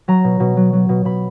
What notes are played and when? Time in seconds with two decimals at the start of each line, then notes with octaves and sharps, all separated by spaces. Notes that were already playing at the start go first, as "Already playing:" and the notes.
0.08 F#3 A#5
0.24 B2
0.40 B2
0.57 F#3
0.73 F#3
0.89 B2
1.05 B2 B5